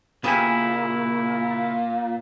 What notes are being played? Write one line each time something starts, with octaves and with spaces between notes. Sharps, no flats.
A#2 C#3 B3 E4 G4 G#5